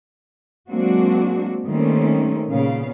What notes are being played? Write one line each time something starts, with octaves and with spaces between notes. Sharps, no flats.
F#3 G#3 A#3 C4 D4 F#4
D#3 G3 A3 A#3 C4 C#4
A#2 C#3 B3 F5